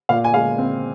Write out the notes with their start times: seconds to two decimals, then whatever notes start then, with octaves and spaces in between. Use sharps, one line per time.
0.09 A#2 F5
0.24 G#5
0.34 G#3 F5
0.58 C4